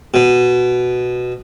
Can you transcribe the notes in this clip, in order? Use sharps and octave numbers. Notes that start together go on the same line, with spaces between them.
B2